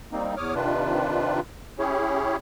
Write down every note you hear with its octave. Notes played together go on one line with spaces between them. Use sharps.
G3 A#3 C4 D#4
E2 C#5 D6 D#6 F6
C3 D#3 D4 F4 B4
C#4 E4 G4 G#4 C#5